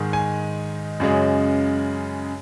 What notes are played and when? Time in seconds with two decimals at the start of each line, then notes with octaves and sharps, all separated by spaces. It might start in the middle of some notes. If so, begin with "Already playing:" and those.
Already playing: G#2 D#3 G#3
0.13 G#5
1.00 F#2 C#3 G#3